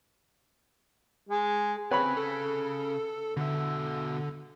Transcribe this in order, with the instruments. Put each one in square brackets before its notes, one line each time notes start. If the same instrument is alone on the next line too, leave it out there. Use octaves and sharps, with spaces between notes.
[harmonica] G#3
[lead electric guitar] C#3 G#5 [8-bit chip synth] C4 [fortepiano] B4 C#5 B5
[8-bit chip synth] A4
[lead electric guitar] B2 E5 [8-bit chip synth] D3